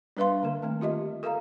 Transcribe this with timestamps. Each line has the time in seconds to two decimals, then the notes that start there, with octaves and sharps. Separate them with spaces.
0.17 G3 D4 B4 E5 F5 C6
0.43 D3 A#3 A#4
0.62 D#3 A3 C4
0.81 F4 G4 D#5 E5
1.23 A4 A#4 E5 F5 A#5